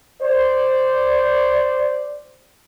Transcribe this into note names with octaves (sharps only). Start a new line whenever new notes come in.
C5 D5